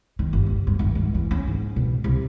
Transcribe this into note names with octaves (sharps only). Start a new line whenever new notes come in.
D#3
G1
D3
G2
D#3
G2
E3
C#4
G#2
B2
C2